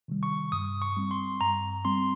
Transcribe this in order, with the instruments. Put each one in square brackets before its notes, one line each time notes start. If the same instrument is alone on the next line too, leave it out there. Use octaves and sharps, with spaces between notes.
[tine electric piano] C3 D#3 G3
[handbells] C#6
[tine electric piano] G2 [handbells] D#6
[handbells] C#6
[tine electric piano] G3 C4
[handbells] C6
[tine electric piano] G2 [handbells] A#5
[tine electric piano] G3 C4 [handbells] C6